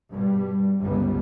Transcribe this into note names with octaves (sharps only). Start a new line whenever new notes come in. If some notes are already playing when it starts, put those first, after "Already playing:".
G2 B2 G3
G1 C#2 G3 G#3 B3